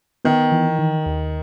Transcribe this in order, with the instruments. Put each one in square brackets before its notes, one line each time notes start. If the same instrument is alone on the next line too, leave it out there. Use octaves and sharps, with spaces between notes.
[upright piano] D#3 [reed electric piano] B3
[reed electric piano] E3
D#3
D#2